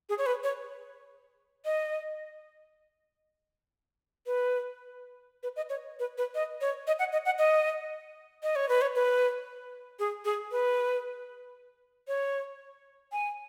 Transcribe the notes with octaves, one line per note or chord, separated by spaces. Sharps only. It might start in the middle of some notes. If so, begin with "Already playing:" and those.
G#4
C#5
B4
C#5
D#5
B4
B4
D#5
C#5
B4
B4
D#5
C#5
D#5
F#5
D#5
F#5
D#5
D#5
C#5
B4
C#5
B4
G#4
G#4
B4
C#5
G#5